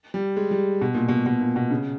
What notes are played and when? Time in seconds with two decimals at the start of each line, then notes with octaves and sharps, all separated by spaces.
0.14 G3
0.37 G#3
0.51 G3
0.81 B2
0.95 A#2
1.08 B2
1.26 B2
1.41 A#2
1.56 B2
1.71 C#3